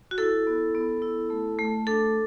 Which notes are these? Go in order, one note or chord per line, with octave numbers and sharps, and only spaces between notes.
F#4
E4 A4
B3
B3
E4
A3
A3
D4 A4